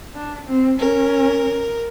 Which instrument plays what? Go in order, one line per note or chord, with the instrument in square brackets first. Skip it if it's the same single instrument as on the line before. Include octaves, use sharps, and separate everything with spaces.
[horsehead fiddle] D4
C4
[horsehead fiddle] C#4 [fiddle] A#4